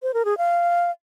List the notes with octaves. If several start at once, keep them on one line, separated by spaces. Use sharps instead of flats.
C5
A#4
G#4
F5